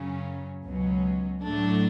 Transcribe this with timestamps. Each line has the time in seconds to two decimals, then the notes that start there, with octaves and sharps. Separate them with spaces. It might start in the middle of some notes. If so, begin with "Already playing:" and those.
Already playing: F#2 C#3 F#3 C#4
0.64 C#2 B2 F#3 C#4
1.43 A2 F#3 A3 D4